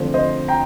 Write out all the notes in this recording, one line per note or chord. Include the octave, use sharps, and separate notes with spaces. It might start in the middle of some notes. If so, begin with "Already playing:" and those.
Already playing: D3 F3 A3 C4 C5
C5 D#5
G5 A#5